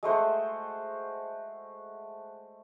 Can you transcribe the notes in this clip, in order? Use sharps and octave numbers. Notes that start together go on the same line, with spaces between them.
G#3 A3 C5 F#5